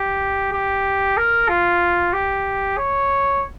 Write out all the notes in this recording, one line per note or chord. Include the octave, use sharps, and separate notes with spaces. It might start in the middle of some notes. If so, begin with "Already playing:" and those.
Already playing: G4
G4
A#4
F4
G4
C#5